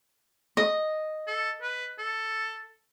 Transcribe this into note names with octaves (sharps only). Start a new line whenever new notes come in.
D#5
A4
B4
A4